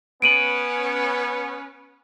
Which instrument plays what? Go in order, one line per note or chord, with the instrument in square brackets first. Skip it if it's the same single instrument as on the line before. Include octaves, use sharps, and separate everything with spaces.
[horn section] B3 C#4 B4 [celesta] D7 D#7 F#7